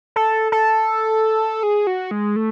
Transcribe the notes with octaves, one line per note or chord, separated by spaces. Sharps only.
A4
A4
G#4
F#4
G#3
A3